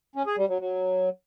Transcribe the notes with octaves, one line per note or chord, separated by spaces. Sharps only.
C#4
G#4
G3
F#3
F#3